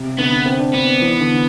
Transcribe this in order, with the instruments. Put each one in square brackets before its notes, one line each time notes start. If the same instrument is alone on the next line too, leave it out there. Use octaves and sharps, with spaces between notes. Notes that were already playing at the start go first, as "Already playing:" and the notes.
Already playing: [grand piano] C3
[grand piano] D3 [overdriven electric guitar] B3
[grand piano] C4
D4
[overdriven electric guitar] B3 [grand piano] D4
[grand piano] E3
D3